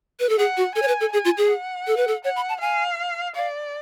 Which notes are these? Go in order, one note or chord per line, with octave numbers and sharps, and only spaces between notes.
B4
A4
G#4 F#5
F#4
A4 G#5
C#5
B4
A4
G#4 G#5
F4
G#4
F#5
A4
B4
A4
C#5 F#5
B5
A5
F5 G#5
D5 F5